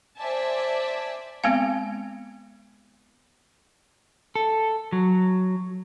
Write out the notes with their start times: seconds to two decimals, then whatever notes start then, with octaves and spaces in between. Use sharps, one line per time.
0.18 C5 D5 E5 G#5 A5
1.44 G#3 B3 C4 F5
4.36 A4
4.93 F#3